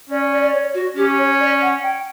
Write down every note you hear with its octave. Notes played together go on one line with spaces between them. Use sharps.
C#4 D5
D5
D5
C#5
F#4
C#4 G4
C#5
D5
F#5
G5